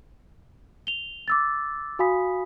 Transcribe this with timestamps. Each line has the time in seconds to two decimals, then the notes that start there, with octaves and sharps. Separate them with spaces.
0.87 F7 G7
1.28 D6 E6 A6
1.99 F#4 F5 G#5 B5 D#6 B6